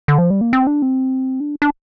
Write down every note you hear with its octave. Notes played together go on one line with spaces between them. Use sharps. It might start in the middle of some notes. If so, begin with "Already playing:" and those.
D3
F3
G3
A#3
C4
D4
C4
D4
D4